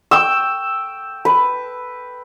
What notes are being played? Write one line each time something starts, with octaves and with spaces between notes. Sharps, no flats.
G5 E6
B4